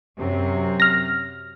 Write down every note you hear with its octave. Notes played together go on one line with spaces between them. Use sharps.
F#2 C3 F#3
F6 A#6